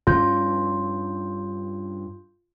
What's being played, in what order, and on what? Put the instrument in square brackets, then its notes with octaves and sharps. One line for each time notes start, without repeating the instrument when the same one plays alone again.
[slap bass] G2 C#4 [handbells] F4 G6